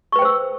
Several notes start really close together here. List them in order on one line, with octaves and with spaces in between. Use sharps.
C#6 B4 G5 C5 E6